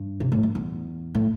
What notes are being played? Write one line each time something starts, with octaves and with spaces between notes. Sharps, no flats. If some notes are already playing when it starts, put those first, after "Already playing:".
Already playing: G2
C3
A2
G2
E2
A2